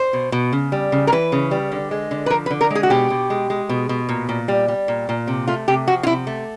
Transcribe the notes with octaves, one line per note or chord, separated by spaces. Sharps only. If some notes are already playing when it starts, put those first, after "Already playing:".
Already playing: C5
B2
B2
C#3
G3
C#3
A#4
E3 B4
C#3
G3
D3
G#3
D3
B4
F3 A#4
B4
D3
A#4
G#3 G#4
F#4
B2 G4
B2
G#3
G#3
B2
B2
A#2
A#2
G3
G3
A#2
A#2
C3
A3 F4
C3 G4
F3 F#4
F4
C3 E4
A3